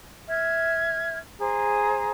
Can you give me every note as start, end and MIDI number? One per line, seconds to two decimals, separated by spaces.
0.29 1.17 76
0.29 1.17 89
0.29 1.17 92
1.38 2.11 68
1.38 2.11 72
1.38 2.11 82